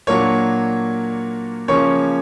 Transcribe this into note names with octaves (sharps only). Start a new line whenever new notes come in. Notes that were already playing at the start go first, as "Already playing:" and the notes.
A#2 F#3 A#3 D4 C#5 C#6
C#3 F3 A#3 C#4 C#5 C#6